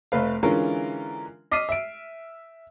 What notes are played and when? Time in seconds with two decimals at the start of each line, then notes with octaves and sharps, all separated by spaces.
0.12 F1 A3 B4 F5
0.43 D3 E3 G#3 C#4 F4 A#4
1.51 D#5 D6 F6 B6 C7 D#7
1.69 E5 D7